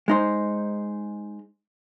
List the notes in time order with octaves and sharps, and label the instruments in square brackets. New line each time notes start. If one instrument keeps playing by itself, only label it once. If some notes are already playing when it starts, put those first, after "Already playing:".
[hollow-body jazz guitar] G#3 D#4 C5